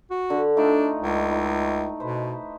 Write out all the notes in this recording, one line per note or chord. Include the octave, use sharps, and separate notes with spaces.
F#4
D3
A3 D4 D#4 F4
C#2
D#4 E4
B2 B4 C5